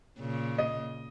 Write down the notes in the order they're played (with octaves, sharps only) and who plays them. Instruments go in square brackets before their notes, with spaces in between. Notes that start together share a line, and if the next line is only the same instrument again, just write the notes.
[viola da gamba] A#2 C#3
[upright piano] D#5